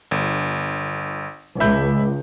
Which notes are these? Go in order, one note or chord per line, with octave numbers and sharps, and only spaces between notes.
G1
C#2 E5 B5 G6